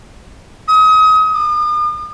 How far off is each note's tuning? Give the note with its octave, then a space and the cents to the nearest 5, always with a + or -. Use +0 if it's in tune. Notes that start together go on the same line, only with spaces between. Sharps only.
D#6 +30
D#6 -45